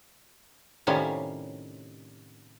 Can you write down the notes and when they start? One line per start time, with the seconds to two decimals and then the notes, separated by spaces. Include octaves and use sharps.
0.87 A2 C3 D#3 G3 C#4 F4